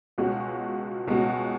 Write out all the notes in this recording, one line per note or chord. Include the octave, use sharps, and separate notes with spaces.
C#2 B2 G#3 C#4 F#4
C#2 B2 G#3 C#4 F#4